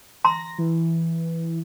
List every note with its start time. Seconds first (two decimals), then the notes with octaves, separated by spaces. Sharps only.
0.25 A#5 C6 A#6
0.58 E3